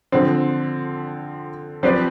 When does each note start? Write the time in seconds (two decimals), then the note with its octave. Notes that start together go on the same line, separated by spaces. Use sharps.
0.12 D3 F3 C4
1.83 F3 C4 G4 B4 D5